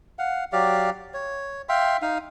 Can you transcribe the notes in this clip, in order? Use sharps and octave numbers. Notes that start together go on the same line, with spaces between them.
F5 F#5
F#3 G4 D5 F5
C#5
E5 F5 G5 C6
D#4 F5